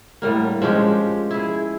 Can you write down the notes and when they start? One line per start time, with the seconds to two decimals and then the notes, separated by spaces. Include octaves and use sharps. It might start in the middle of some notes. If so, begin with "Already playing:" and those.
0.22 A2 D3 G3 A#3
0.62 F3 G#3 C#4 G4
1.31 E4 G#4